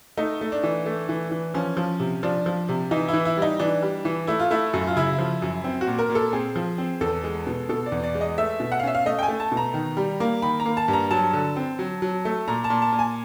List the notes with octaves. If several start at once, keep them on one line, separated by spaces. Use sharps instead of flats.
A3 D#4
A3
D4
E3
A3
E3
E3
F3 C#4
F3
C3
F3 D4
F3
C3
E3 D#4
E4
E3
E4
G3 D#4
E3 D4
G3
E3
A3 E4
F4
A3 E4
F#2
F4
C#3 E4
F3
F#2
C4
F#4
A#2
A#4
A#2
A4
C4 G#4
F3
C4
E2 A4
G#3
B2
B2 A4
D5
E2
D5
G#3
D#5
A3 E5
B2
F#5
F5
C#4 E5
F5
A3 D#5
G5
G#5
A3
A5
B2
A#5
D#3
G3
A#3
D#3 B5
A#5
A#3
A5
G2
A#5
F#3 A5
D3
C4
F#3
F#3
A3
A#2 A#5
A5
A#2
A5
A#2
G#5